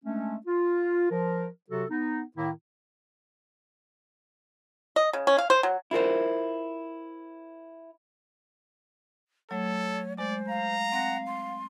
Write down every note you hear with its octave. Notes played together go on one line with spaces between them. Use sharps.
G#3 A3 C#4 D4
F4
F3 A#4
C3 F#3 F#4 A4
B3 D#4
A2 D#3 A#3 E4
D#5
C#3
C#4
F5
C5
F#3
E4 F4 A#4 C5
F#3 A3 A4 C#5
G#3 C5 D5
F5 A#5
C4 F#5 A#6
C6